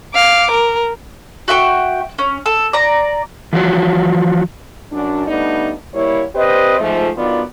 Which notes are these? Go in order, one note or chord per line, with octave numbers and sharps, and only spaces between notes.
F5 D6
A#4
F#4 E5 G5 C#6
C#4
A4
D5 A#5
E3 F3 F#4
F#2 D4
G3 A3 B3 D4 D#4 D5
G3 A#3 E4 C#5
C4 G4 B4 C5 D5 D#5
G#2 F3 A3
D3 D#3 F#3 B3 F4 D5